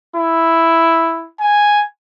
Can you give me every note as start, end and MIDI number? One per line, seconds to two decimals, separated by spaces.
0.16 1.28 64
1.41 1.83 80